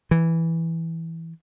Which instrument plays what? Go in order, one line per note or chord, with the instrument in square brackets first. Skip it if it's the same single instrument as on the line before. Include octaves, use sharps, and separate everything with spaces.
[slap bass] E3